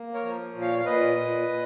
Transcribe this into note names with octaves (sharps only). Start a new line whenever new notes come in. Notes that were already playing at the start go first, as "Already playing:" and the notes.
Already playing: A#3
A#4 C#5
F3
A#2
C#5 F5
F5
A#2 B4 D#5
A#2
A#2